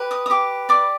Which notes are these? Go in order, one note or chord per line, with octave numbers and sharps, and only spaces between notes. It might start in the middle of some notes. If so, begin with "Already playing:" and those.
Already playing: G4 B4
D#6
D#6
G4 D6
D5 D6